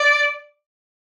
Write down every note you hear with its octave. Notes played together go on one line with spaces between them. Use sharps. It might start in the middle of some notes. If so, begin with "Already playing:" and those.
Already playing: D5